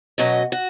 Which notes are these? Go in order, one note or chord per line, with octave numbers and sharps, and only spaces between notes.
B2 F#3 C#4 D#5
F#4